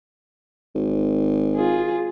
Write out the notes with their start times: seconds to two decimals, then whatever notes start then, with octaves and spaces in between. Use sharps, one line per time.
0.75 G#1
1.56 F4 G#4